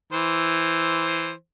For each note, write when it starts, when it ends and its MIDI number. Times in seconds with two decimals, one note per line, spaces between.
0.13 1.31 52
0.13 1.31 72